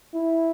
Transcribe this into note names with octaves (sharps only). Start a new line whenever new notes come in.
E4